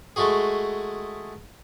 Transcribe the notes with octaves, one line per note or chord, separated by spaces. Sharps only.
G#3 A3 D#4 F#4 G#4